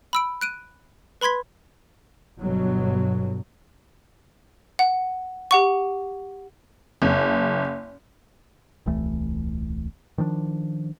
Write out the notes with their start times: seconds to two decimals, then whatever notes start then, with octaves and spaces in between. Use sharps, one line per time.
0.13 B5 E6 D7
0.41 F#6 D7 D#7
1.21 B4 B5 C6 G#6 B6
2.38 G1 B2 F#3
4.79 F#5
5.51 G4 F#5 C#6
7.02 F#1
8.86 D#1 C2 E3 A3
10.18 D#3 F3 G3 D4